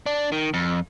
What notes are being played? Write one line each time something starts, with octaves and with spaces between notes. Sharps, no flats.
D4
D#3
F2